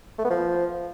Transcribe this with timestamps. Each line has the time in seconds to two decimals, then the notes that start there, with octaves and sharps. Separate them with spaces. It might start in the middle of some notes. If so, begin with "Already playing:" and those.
0.19 A3
0.24 B3
0.30 F3